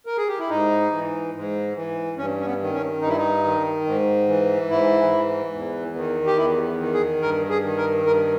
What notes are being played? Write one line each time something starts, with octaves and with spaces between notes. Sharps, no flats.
A#4
G#4
G4
E4
G#2 D#4
E3
G#2
E3
G2 C#4
C#4
B3
D#3
C#4
G2 D#4
E4
D#4
D#3
G#2
E3
G#2 E4
E3
E2
D#3
G4
E2 E4
D#3
G#4
G2 A#4
G#4
D#3
A#4
G2 A#4